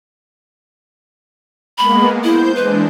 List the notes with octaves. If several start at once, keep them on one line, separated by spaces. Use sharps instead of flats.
G#3 A#3 B3 B5
E4 C5 G6
E3 G#3 D4 B4